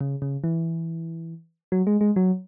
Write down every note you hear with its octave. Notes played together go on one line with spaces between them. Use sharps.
C#3
C#3
E3
F#3
G#3
G#3
F#3